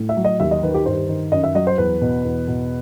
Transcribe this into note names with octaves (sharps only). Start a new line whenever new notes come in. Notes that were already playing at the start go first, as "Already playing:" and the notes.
Already playing: A2
E5
F#3
D#5
D#2 E5
D#5
D#3 B4
G4
G2 C5
D#3
F#2 D#5
E5
F#3 D#5
C5
E2 B4
B2
E2
B2